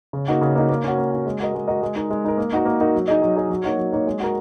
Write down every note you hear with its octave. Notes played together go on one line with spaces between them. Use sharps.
C#3
A#3 D#4 F#4
C#3
A#3 D#4 F#4
A#3
C#4 F#4
A#3
C#4 F#4
G#3
F#4 A#4 D#5
G#3
F#4 A#4 D#5
G#3
D#4 A#4
G#3
D#4 A#4
A#3
D#4 F#4 A#4
A#3
D#4 F#4 A#4
F#3
D#4 G#4 D#5
F#3
D#4 G#4 D#5
F#3
A#3 D#4 F#4 C#5
F#3
A#3 D#4 F#4 C#5
G#3
F#4 A#4